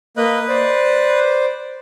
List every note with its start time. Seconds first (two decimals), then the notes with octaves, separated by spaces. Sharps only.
0.17 A#3 B4 D#5 B5
0.48 C5 D5